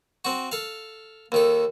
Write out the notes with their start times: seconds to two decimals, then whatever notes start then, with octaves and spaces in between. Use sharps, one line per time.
0.25 C4 F#4
0.52 A4 F5
1.32 D#2 D#3 A4